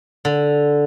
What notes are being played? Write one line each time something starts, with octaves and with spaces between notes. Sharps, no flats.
D3